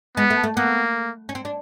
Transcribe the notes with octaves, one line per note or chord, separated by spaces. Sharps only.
G#3 B3
A3
A3
A#3 B3
C#4
C4
D4